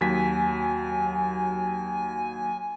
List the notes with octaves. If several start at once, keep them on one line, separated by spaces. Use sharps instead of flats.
D#2 F#3 G#5 B6